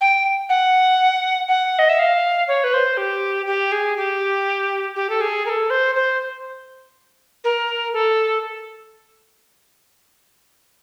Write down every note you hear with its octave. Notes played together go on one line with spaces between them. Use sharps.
G5
F#5
F#5
D#5
E5
F5
C#5
B4
C5
G4
G4
G#4
G4
G4
A4
G#4
A#4
A4
C5
C5
A#4
A4